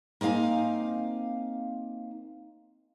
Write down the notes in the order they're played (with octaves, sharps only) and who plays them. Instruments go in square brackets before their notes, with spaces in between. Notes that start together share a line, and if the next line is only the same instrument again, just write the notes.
[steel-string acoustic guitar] A#3 C4 D#4 F5 G#5